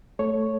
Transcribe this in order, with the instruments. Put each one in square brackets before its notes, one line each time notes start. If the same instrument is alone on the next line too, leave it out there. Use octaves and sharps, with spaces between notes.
[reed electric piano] A3 A4 C#5